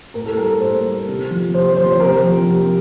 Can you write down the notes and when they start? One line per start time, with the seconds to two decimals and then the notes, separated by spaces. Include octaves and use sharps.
0.14 A2 A#4
0.26 A4
0.37 G3 A#4
0.60 A2 C5
0.84 G3
1.08 C3
1.31 F3
1.54 C3 C5
1.77 F3 C5
1.93 C5
2.00 C3 A#4
2.24 F3
2.46 C3